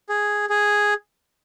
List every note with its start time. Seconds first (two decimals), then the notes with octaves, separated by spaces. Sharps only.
0.09 G#4
0.49 G#4